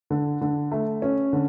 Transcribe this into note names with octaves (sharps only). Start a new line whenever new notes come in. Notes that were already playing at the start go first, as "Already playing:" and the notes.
D3
D3
A3
C#4
D3